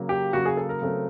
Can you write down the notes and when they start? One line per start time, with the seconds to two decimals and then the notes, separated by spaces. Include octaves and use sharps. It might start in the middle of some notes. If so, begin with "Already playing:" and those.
Already playing: C#3 F#3 A#3
0.09 G4
0.33 C#3 F#3 A#3 F#4
0.45 G#4
0.57 A4
0.69 A#4
0.82 C#3 F#3 A3 C4